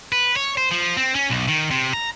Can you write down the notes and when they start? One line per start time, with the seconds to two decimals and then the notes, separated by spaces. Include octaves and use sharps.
0.12 B4
0.36 C#5
0.57 C5
0.71 F3
0.97 C4
1.15 C#4
1.30 B1
1.48 D#3
1.71 C3
1.94 A#5